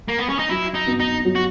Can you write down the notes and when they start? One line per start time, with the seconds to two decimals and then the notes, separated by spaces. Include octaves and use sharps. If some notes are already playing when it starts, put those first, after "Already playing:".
0.08 A#3
0.19 B3
0.29 C#4
0.39 D#4
0.49 F#3 E4
0.74 D#4
0.87 B3 F#4
1.00 D#4
1.25 F#3
1.35 F#4